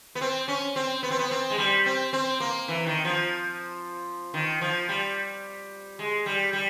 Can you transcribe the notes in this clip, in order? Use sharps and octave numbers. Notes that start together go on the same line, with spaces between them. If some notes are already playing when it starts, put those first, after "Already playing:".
B3
C4
C#4
C4
B3
C4
B3
C4
G#3
G3
C4
C4
A#3
E3
D#3
F3
D#3
F3
G3
G#3
G3
G3